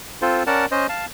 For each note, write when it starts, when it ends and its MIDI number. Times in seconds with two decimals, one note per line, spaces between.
0.22 0.43 60
0.22 0.43 65
0.22 0.43 69
0.22 0.43 72
0.47 0.66 61
0.47 0.66 70
0.47 0.66 74
0.47 0.66 78
0.47 0.66 81
0.71 0.87 61
0.71 0.87 72
0.71 0.87 75
0.89 1.06 77
0.89 1.06 81